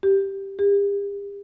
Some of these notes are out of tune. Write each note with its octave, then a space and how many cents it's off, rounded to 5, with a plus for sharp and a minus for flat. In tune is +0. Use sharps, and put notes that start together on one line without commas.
G4 +0
G4 +40